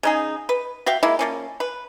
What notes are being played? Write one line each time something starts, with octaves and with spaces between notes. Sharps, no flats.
C#3 D#4 G#4
B4
F#4 E5 F5 G5
G#3 A#3 E4
F3 A#3 C#4
B4